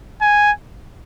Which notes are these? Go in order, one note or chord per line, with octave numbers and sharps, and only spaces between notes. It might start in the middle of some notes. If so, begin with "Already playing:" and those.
G#5